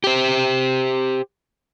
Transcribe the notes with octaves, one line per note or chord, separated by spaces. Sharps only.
G4 C5